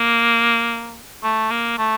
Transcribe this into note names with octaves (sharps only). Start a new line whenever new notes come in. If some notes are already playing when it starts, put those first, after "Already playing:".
Already playing: A#3
A3
A#3
A3